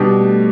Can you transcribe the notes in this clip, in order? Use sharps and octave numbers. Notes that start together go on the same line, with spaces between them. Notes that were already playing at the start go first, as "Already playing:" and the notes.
Already playing: B2 G3 D4 G4
A3